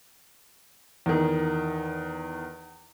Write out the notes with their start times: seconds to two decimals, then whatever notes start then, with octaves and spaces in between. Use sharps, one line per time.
1.06 E2 D#3